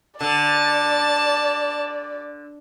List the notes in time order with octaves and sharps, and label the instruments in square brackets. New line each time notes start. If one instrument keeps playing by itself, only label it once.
[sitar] D3 [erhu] D5 [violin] A5